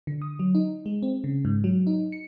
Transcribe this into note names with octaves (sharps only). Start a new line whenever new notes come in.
D3
D#6
F#3
D#4
G#3
C4
C#3
G#2
F#3
D#4
C#7